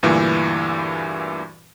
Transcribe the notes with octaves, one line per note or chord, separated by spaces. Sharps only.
D2 G2 A#2 E3